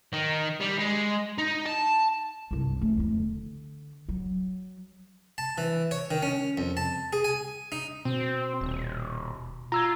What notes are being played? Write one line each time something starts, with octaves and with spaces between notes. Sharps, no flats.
D#3
G3
G#3
D#4
A5
C2 G2
A3 C#4
E2 G#3
D3
F#3
A5
E3
C#5
D#3
C#4
F2
A5
G#4
G#5
D#4
B2 C4
D#1
F4 A#5 E6 G#6